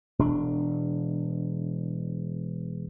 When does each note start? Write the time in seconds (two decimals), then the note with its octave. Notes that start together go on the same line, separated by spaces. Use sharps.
0.19 E1 D4